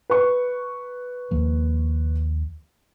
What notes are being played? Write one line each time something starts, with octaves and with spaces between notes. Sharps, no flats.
B4 C#6
D#2 F3 A#3